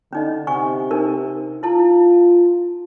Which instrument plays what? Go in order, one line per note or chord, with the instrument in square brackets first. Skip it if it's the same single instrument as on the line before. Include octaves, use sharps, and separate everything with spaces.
[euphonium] D3 [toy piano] C#4 D#4 D#5
[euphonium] C3 [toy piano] F#5 G#5 C#6
[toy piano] D4 D#4 A#4
[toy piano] E4 A5 [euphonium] F4